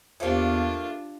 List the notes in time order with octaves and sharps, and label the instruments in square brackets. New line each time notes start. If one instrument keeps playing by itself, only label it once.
[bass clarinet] E2 [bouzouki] A3 A#3 [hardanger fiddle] D4 F4 [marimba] G4 C5 E5